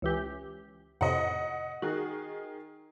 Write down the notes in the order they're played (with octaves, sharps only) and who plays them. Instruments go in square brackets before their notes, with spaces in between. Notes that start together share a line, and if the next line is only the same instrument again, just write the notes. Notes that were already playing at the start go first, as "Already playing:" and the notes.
[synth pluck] C#2 E3 G4
[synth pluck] F2 A2 C3 [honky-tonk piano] D#5 F#5
[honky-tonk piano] D#3 G#4 [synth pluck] F#4